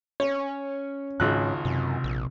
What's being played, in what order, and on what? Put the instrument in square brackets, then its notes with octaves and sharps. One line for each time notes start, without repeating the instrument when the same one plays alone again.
[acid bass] C#4 [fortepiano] C#5
[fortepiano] G#1 C#2 F#6 [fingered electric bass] G#2
[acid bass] F#2 [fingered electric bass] C3
[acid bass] A#1